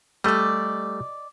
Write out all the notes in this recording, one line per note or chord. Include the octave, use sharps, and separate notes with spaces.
G3 A3 D5 D#5